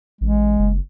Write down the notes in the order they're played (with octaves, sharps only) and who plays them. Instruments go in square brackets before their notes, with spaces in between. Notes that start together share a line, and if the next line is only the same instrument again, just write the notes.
[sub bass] A1 [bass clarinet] G#3
[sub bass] F#1